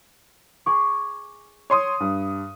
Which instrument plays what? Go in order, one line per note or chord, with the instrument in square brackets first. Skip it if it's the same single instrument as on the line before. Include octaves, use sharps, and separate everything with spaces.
[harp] G#4 C#6 D6
[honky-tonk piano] C#5 C6 D#6
G2